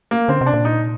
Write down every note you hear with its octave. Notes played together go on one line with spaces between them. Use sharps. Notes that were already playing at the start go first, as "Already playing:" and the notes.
A#3
D3 C4
C3
D4
A#2
D#4